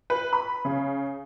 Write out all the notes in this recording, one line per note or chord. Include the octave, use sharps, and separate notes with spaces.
B4
B5
C#3